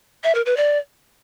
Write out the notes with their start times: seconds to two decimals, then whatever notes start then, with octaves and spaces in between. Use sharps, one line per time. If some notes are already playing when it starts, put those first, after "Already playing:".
0.24 E5
0.35 A#4
0.46 B4
0.57 D5